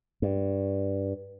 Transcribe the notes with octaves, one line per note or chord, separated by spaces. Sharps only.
G2